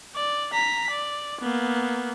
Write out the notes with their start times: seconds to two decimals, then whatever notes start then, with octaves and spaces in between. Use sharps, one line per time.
0.15 D5
0.53 A#5 B6
0.91 D5
1.41 A#3 B3